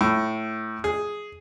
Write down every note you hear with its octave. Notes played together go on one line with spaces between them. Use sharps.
A2
G#4